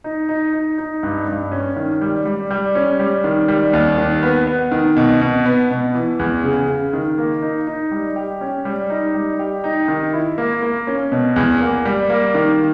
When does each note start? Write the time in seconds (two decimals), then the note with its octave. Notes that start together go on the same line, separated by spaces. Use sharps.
0.04 D#4
0.29 D#4
0.53 D#4
0.78 D#4
1.03 G2
1.28 G2
1.52 C#4
1.76 D#3
2.01 G3
2.25 G3
2.50 G3
2.75 C#4
2.99 G3
3.24 D#3
3.48 G3
3.73 D#2
3.98 D#3
4.23 B3
4.47 B3
4.72 D#3
4.97 B2
5.21 B2
5.46 B3
5.71 B2
5.94 E3
6.19 E2
6.43 C#3
6.68 C#3
6.93 D#3
7.18 A#3
7.42 D#4
7.67 D#4
7.91 G3
8.16 G4
8.41 C#4
8.65 G3
8.90 D#4
9.14 G3
9.39 G4
9.64 D#4
9.88 D#3
10.13 E4
10.38 A#3
10.62 A#3
10.87 C#4
11.12 B2
11.36 E2
11.61 A#3
11.85 G3
12.10 A#3
12.34 D#3